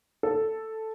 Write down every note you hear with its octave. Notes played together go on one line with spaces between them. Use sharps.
A4